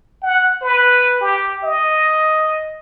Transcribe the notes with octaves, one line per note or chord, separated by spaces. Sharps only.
F#5
B4
G4
D#5